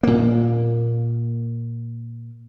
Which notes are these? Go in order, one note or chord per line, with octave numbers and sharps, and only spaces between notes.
A#2 A#3